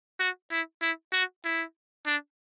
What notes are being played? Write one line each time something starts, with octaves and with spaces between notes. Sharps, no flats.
F#4
E4
E4
F#4
E4
D4